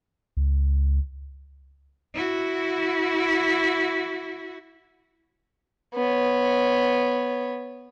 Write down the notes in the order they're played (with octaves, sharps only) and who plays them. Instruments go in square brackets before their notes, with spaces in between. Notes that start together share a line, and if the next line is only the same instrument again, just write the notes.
[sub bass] C#2
[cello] E4 F#4
[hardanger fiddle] B3 C#5